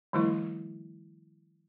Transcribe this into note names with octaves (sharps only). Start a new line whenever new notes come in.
D#3 F3 G3 A3 E4